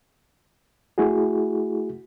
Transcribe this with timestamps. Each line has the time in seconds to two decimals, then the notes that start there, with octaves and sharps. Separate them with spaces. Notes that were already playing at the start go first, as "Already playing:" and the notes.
0.98 A3 E4 F#4 G#4